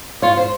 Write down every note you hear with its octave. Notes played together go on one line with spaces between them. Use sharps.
F4 C#5
C5